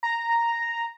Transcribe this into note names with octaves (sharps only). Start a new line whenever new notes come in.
A#5